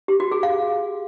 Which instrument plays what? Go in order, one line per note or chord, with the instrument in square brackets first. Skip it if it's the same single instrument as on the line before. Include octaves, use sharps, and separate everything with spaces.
[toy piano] G4
F#4
G#4
F5